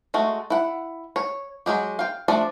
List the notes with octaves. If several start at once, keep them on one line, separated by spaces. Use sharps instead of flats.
G#3 A3 F#4
E4 F#5
C#5
F#3 G#3 G4
F5 G5
F3 A3 D4 D5